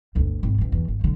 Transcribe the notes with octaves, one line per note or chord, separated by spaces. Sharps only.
G1 D2
G#1
A1 A2
E2
G#1
F#2 D3